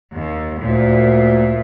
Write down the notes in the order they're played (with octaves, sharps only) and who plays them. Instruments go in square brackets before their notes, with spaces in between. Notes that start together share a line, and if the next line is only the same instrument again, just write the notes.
[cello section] D#2
[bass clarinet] D2 [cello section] A#2